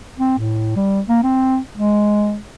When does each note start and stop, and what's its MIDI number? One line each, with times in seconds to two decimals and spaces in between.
0.19 0.36 60
0.39 0.74 45
0.76 1.00 55
1.09 1.19 58
1.23 1.58 60
1.77 2.38 56